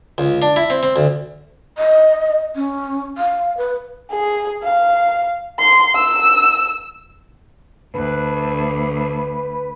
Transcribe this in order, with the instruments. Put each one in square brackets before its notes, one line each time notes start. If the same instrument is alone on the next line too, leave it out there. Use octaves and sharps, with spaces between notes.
[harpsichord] C#2
D4
E4
C4
C4
D2
[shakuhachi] D#5
C#4
F5
B4
[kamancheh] G#4
F5
C6
E6
[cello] D2 [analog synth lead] B4